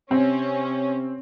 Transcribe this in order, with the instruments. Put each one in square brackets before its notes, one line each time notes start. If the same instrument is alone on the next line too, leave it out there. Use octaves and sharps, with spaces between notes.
[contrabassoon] C3 [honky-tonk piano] C4 [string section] C#4